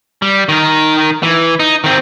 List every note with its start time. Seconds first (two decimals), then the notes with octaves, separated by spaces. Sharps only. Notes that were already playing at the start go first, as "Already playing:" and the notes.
0.22 G3
0.49 D#3 A#4
1.23 E3
1.60 D#4
1.84 D#3 C4